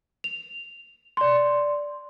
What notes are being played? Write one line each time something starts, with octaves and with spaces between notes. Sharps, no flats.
F7
D5 C6